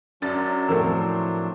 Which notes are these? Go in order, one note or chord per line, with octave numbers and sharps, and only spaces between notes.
F#2 F#3 D4 A6
A2 F3 A3 C4 A#4 E6